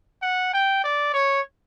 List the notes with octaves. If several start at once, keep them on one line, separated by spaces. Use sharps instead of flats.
F#5
G5
D5
C#5